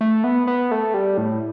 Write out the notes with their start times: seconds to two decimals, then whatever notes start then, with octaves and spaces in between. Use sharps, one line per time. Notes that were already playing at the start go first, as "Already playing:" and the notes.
0.01 A3
0.24 B3
0.47 B3
0.71 A3
0.94 G3
1.18 A2